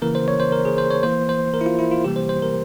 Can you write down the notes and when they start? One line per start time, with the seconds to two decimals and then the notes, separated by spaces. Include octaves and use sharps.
0.02 C#3 E3 A#3 A#4
0.15 C5
0.28 C#5
0.40 C5
0.52 A#4
0.65 G#4
0.78 C5
0.90 C#5
1.03 E3 A#3 C5
1.29 C5
1.54 A#4
1.61 E4
1.66 F4
1.79 E4
1.91 F4
2.04 C3 E3 G3 A#3 G4
2.16 C5
2.29 C5
2.42 A#4